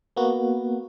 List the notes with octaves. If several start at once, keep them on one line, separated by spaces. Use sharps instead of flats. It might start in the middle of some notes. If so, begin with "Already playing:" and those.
A#3 B3 F#4